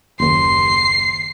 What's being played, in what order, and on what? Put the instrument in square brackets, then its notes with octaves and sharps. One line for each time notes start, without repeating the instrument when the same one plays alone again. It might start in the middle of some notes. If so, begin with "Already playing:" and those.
[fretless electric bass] F#1 D#2 [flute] C6 [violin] C7